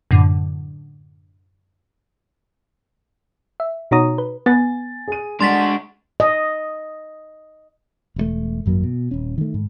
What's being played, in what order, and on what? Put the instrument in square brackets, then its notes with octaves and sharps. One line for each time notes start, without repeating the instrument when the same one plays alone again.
[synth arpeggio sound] F#2 A2 D3
E5
B2 D#4 F#4 C#5 A#5 D#6
B4
[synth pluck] B3 [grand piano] G#5 A6
[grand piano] G#4 D#7
[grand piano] G#3 [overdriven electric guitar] D4 F#4 [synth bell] C6 A6 B6
[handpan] D#5
[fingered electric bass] E1 C3 A3
G#1 F#2 F#3 A#3
B2
D#1 C#4
D#3 A3
G#2